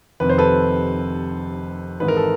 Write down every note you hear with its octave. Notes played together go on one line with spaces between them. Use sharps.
F1 F2 C3 D#3 B4
C5
A4 B4
G#1 G#2 E3 B4
A#4
A4